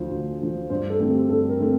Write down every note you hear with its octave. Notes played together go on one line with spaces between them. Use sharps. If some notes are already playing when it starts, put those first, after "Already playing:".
Already playing: D2 D3 F3 C5
D2
D3 F3
G2 C5
A4
D3 A3 C4
G4
G2 A4
A#4
D3 A3 C4